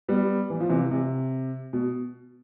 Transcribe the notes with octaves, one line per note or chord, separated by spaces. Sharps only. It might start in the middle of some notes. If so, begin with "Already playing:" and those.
G3 B3
E3
F3
C3 E3
C3
B2